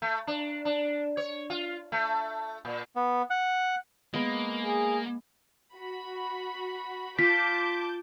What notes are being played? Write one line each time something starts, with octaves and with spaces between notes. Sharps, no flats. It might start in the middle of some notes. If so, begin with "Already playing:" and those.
A3
D4
D4
C#5
F4
A3
A#2
B3
F#5
G#3 A#3 B3
G#4
F#4 B5
F4 A5 D6 G6 B6